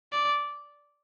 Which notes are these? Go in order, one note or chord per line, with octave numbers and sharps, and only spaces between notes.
D5